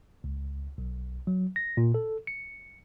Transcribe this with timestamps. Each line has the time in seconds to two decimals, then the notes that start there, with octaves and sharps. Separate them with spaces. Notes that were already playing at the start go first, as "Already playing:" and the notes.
0.24 C#2
0.78 B1
1.27 F#3
1.56 A#6
1.77 A#2
1.94 A4
2.27 C#7